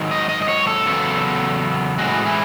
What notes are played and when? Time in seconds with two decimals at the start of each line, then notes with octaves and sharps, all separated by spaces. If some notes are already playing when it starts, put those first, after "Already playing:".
Already playing: G#2 D#3 F#3
0.11 D#5
0.29 D#5
0.42 D#5
0.49 C#5
0.67 A4
0.86 E2 C#3 F#3 B3
1.98 A2 E3 G#3 F#4
2.26 E4